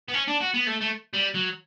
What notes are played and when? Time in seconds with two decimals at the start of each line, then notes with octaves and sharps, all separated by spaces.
0.08 B3
0.14 C#4
0.27 D4
0.41 F#4
0.54 B3
0.67 A3
0.81 A3
1.13 G3
1.35 F#3